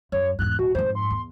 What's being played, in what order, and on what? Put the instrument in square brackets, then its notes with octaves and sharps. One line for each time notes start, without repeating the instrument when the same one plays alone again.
[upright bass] F#2 [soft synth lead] C#5
[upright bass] E2 G#2 [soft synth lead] F#6
[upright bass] D#1 [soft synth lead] F#4
[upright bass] F2 G#2 [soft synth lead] C5
[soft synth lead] C6
[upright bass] E2